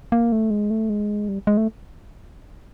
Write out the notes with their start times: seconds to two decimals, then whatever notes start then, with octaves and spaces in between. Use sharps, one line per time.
0.12 A#3
0.32 A3
0.50 G#3
0.70 A3
0.90 G#3
1.29 G3
1.47 G#3
1.57 A3